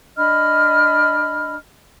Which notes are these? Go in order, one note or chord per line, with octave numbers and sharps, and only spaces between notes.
D4 D#5 B5 F6